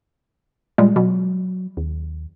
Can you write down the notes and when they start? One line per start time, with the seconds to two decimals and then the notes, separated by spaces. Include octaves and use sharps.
0.78 A#2 G3 G#3
0.96 B2 F#3
1.77 D#2